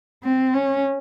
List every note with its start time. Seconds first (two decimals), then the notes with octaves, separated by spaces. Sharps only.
0.23 C4
0.53 C#4